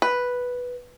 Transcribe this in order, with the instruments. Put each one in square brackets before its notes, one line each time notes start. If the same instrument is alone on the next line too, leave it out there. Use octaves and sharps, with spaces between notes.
[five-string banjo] B4